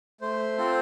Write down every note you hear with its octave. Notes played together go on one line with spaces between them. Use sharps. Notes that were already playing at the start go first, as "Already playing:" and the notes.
A3 C5
C4 F4 A4